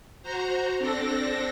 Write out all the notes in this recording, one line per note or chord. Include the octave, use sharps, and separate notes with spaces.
F#4 C5 A#5
C4 D4 A4 A#6